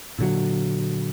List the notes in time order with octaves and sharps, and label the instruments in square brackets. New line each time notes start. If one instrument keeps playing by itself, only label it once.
[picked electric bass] A#2 D3 F#3